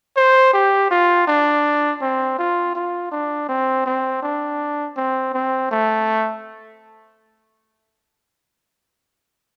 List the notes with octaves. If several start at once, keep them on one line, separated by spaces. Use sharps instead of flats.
C5
G4
F4
D4
C4
F4
F4
D4
C4
C4
D4
C4
C4
A3